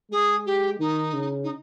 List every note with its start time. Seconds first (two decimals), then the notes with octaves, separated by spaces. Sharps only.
0.11 G#3 G#4
0.46 G4
0.79 D#3 D#4
1.13 C#3
1.43 D#4